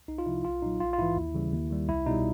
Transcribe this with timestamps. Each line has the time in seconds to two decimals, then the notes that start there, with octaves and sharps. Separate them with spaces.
0.08 C2 D#4
0.18 F4
0.26 C3 F3 E4
0.44 B1 F4
0.62 A#2 F#3 D#4
0.80 A#1 F4
0.93 F4
0.98 G#2 E3 E4
1.17 D#2
1.35 C#3 E3 G3
1.53 D#2
1.70 D#3 G3
1.89 C2 E4
2.06 B2 G3 D#4